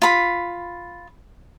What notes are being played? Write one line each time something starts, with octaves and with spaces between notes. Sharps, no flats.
F4 B5